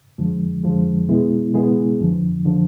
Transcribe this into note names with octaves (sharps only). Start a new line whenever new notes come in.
F2 D3 F3 G#3
F2 D3 F3 G#3
B2 G#3 B3 E4 G#4
B2 G#3 B3 E4 G#4
F2 D3 F3
D3 F3